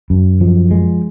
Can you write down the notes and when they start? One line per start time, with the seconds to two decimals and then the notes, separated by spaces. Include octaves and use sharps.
0.10 F#2
0.41 F3
0.71 G#3